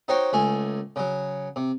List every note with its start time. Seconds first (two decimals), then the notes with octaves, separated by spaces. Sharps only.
0.08 D#4 F#4 C5 C#5 G5
0.33 C#2 A3 G#5
0.96 C#3 F#3
1.56 C3